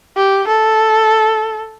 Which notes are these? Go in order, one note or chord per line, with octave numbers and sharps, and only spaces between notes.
G4
A4